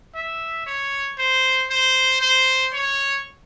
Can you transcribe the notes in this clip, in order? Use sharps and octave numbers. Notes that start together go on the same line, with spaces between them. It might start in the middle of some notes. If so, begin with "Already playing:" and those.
E5
C#5
C5
C5
C5
C#5